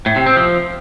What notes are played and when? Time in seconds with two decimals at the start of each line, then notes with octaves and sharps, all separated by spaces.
0.06 A2
0.16 C3
0.26 C4
0.36 F3